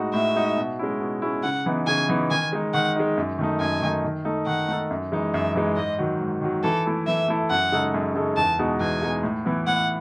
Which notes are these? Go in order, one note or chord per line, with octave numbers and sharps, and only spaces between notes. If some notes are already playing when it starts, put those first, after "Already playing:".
Already playing: A2 G#3 D#4 F#4
A2 E5
G#3 D#4 F#4
B2
G#3 C#4 E4
B2
G#3 C#4 E4
C#3 F#5
E3 B3 D#4
C#3 G#5
E3 B3 D#4
D#3 G#5
G#3 D#4
D#3 F#5
G#3 D#4
F#2
D#3 A3 D#4
F#2 G#5
D#3 A3 D#4
D#3
A3 D#4 A4
D#3 F#5
A3 D#4 A4
F#2
E3 G#3 D#4
F#2 E5
E3 G#3 D#4
G#2 D#5
D#3 F#3
G#2
D#3 F#3
E3 A4
A3 E4 A4
E3 E5
A3 E4 A4
F#2 F#5
C#3 G#3 D#4 A4
F#2
C#3 G#3 D#4 A4
E2 A5
B2 G#3 D#4
E2 G#5
B2 G#3 D#4
A2
E3 B3 E4
A2 F#5